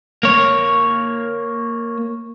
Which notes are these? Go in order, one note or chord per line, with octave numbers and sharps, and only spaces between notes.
A#3 C#5